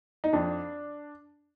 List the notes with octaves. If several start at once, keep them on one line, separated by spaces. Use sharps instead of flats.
D#4
F2 D4